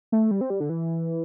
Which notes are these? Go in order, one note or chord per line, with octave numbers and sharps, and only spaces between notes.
A3
G3
C4
G3
D3
E3